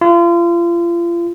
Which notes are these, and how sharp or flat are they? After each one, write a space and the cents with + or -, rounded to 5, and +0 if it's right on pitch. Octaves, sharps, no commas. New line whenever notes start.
F4 -35